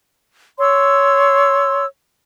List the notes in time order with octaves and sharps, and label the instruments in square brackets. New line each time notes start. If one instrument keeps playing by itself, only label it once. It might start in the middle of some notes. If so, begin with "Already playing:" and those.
[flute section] C#5 C6 E6